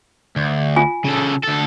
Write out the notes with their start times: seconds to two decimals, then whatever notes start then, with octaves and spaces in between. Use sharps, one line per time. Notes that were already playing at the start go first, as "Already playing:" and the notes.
0.36 D2
0.76 F4 G#5
1.05 C#3 A4
1.43 D2 A4